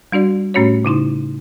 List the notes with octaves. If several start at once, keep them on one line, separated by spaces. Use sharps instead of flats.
G3 D4 F#4 D5
A2 A3 C#4 F#4 C#5
C#3 D#4 E4 C6